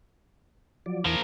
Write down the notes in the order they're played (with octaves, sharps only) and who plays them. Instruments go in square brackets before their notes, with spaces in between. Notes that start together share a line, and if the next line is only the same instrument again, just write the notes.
[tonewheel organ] F3 F#3 D5
[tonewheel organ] E2 E3 [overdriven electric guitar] F3 A#4